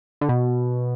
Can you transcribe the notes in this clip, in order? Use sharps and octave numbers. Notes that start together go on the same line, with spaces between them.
D3
B2